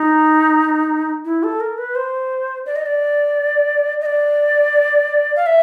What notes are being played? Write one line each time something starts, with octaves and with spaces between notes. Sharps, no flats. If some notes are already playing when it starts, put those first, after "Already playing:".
Already playing: D#4
E4
A4
A#4
B4
C5
D5
D#5
D5
D#5
D5
F5
E5